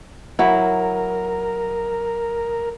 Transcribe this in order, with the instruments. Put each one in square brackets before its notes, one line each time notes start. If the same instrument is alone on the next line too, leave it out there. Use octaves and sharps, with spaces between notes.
[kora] F#3 E4 [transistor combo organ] A#4